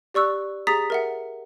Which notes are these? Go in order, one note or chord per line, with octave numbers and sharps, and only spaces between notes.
G4 D5 C#6 E6 F#6
G4 G#4 A#5 D#6 A6 B6
A#4 E5 F#5